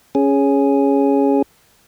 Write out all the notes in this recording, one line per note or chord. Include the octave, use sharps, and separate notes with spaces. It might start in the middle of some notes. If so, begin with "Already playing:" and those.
C#4 G#4